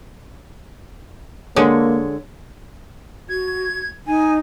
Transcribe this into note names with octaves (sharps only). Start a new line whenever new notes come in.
D3 G#3 A#3 G#4 A4 C#5
F#4 G#6
D#4 G#5